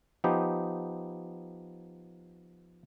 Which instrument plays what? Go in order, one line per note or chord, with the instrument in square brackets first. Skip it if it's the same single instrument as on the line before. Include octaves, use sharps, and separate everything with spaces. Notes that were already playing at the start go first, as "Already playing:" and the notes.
[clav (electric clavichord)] F3 B3 D#4 G4